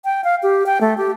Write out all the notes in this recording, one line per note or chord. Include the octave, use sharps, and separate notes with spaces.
G5
F5
G4
G5
A3
G4